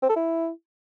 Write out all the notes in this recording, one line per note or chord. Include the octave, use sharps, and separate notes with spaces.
C4
A4
E4